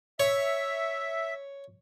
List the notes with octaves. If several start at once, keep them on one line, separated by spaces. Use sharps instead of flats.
C#5 E5